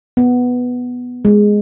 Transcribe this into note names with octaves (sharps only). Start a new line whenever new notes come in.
B3
G#3